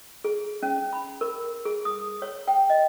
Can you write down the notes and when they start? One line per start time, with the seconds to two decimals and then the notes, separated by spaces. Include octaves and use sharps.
0.24 G#4
0.63 C#4
0.93 B5
1.21 A#4
1.65 G#4
1.85 D#6
2.22 C#5
2.48 G5
2.70 D#5